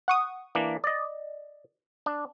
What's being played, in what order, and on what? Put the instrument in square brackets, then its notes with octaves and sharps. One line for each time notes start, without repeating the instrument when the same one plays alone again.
[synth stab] F#5 C#6 D#6
[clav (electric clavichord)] E3 A#3 D4
D5 D#5
D4